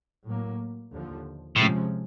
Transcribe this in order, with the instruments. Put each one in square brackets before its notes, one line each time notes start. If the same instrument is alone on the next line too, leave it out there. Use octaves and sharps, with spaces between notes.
[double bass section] A2 F#3 A#3
D#2 D3 F3
[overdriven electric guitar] A2 [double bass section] C3 F3 G#3 C#4